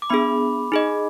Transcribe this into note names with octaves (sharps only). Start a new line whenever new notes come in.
D6
B3 D4 G#4 B5
D#4 G#4 D#5